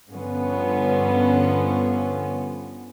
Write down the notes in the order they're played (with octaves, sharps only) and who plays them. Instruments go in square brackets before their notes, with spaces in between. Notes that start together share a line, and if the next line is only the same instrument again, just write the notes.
[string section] G2 D3 F3 B3 C#4